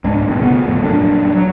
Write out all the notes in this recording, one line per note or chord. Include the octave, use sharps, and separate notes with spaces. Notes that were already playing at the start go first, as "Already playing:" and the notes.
C#2 G#2 G#3 D4
D1 A1 B2
C#3 B3
G1 F2 A2
D#1 F#2 D4
F#3